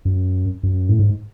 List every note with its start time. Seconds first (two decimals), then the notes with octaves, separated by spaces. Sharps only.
0.05 F#2
0.63 F#2
0.89 A2
0.99 G#2